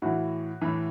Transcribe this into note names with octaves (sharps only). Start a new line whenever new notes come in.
A2 E3 F#4
A2 E3